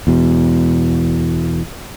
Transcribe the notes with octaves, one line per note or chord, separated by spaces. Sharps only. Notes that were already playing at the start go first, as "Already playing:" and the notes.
E2 B2